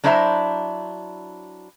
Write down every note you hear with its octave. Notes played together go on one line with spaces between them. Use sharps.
F#3 D4 E4 C5 E5 A#5